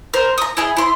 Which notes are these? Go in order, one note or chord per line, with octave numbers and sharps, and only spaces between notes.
A#4 C5
A#5 D#6
E4 G#4 D#5
E4 C6